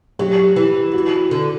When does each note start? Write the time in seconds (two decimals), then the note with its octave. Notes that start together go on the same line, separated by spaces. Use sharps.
0.19 F#3 G4
0.56 E3
0.93 F#4
1.31 D3